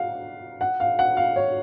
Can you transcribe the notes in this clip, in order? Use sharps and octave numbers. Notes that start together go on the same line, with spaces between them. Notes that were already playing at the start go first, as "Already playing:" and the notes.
Already playing: F5 F#5
F#5
F5
F#5
F5
C#5